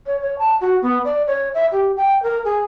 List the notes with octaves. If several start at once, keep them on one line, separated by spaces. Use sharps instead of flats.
C#5
C#5
A5
F#4
B3
D5
C#5
E5
G4
G5
A#4
G#4